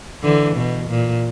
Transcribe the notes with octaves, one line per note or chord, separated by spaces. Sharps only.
D3 E3
B2
A#2